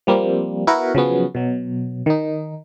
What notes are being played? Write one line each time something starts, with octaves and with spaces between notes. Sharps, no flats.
F3 G3 A#3 C4
B3 E4 F#4 A#4 B4 F#5
C#3 F3 F#3 B3 C#4
B2 F#3
D#3 D#4